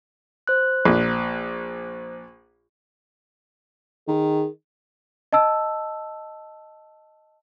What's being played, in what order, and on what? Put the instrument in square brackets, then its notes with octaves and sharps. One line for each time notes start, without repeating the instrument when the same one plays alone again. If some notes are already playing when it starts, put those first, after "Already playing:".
[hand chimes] C5 F#6
[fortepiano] A#1
[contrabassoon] D#3 [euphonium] G#4
[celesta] D#5 A5 E6